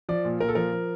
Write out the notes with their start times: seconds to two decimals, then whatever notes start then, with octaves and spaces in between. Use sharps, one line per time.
0.09 F3 D5
0.25 A#2
0.40 A#2 A#4
0.49 A4
0.55 F3 A#4
0.72 F3